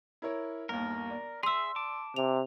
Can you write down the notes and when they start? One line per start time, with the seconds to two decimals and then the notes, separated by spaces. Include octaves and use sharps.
0.22 E4 A#4 C#5
0.69 G1 D#2 A#4
1.10 D5
1.43 G#4 E5 C6 E6
1.76 A5 D6
2.16 C3 F7